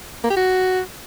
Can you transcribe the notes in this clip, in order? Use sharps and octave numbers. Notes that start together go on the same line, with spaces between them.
A#3
G4
F#4